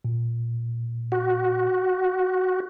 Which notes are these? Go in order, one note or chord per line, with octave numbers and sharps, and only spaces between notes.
A#2
F#4